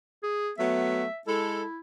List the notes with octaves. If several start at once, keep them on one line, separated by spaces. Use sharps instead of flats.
G#4
F#3 A3 B3 E5
G#3 E4 A4